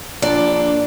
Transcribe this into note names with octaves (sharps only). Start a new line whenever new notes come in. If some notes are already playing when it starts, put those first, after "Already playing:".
A#1 D4 D5